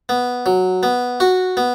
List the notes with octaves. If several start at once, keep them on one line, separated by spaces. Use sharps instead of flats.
B3
F#3
B3
F#4
B3